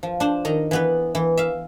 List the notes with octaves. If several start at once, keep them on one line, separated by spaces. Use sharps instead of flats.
F3
D4 C5
D#3 D#5 A#5
E3 B3 B4
E3
E5 F5